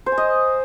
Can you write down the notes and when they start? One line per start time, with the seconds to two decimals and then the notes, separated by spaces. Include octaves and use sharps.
0.06 C5
0.12 G#5
0.18 D#5